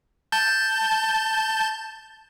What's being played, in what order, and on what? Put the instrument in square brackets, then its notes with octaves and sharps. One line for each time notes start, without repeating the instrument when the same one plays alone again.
[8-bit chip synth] A5 G6